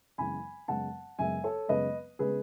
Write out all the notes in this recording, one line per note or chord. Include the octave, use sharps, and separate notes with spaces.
F#2 C#3 E3 G#3 B3 G#5 B5
F#2 C#3 G#3 B3 F#5 A5
F#2 C#3 G#3 B3 E5 G#5
A4 C#5
F#2 C#3 G#3 B3 B4 D#5
C#3 G#3 B3 G#4 B4